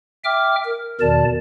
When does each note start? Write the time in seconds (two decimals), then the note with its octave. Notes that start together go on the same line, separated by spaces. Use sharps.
0.25 E5 G5 D6 F6
0.65 A#4
1.01 E2 B2 D#3 D5 A5